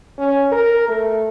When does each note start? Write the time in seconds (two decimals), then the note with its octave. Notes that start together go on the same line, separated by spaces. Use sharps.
0.18 C#4
0.52 A#4
0.88 A3